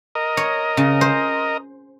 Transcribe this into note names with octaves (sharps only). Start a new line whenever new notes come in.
A#4 D#5
C#5
C#3
C5